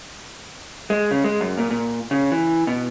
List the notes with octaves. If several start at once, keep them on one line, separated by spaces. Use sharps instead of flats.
G#3
C#3
G#3
F#2
A#2
A#2
C#3
E3
B2